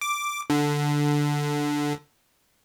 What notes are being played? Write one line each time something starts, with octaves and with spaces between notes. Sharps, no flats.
D6
D3